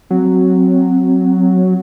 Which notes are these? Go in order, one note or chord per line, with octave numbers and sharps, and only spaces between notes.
F#3 C4